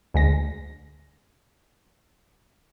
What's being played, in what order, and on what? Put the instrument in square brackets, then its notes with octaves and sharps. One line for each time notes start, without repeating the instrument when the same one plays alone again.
[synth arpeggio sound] D2 G#3 A#6